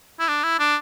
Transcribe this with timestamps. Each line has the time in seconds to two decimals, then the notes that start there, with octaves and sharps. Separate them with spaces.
0.20 E4
0.28 D4
0.43 E4
0.59 D4